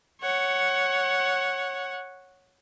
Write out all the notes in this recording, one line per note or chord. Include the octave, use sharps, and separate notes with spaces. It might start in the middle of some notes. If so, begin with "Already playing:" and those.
C#5 F#5